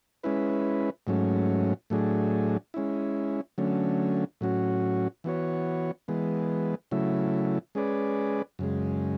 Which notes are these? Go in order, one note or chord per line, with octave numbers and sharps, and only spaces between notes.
G#3 C#4 E4 B4
G#2 F#3 A3 C#4
A2 F#3 A3 D4 G#4
G#3 C#4 E4
D3 F#3 A3 C#4
A2 F#3 C#4 F#4
E3 B3 F#4 C#5
E3 G#3 B3
C#3 F#3 A3 E4
G#3 C#4 G#4 B4 D5
F#2 C#3 G#3